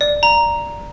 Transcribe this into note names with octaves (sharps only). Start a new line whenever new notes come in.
D5
A#5